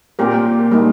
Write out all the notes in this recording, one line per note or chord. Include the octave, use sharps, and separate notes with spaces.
A#2 C4 G4 A#4
G3 A#3 D#4